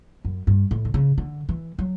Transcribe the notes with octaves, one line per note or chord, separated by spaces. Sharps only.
F#2
G2
A2
D3
C#3
D3
E3
F#3